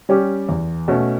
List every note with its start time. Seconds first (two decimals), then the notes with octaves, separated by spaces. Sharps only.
0.09 G3 C#4 G4
0.49 E2
0.88 B2 A3 C#4